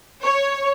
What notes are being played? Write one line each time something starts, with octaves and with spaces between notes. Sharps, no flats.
C#5